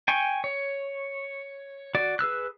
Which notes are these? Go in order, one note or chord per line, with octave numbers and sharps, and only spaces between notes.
G5 G#5 C#6
C#5
F#4 D5
G#4 B4 E6 F#6